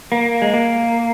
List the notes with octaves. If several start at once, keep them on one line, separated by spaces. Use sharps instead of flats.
A#3
G#3
A#3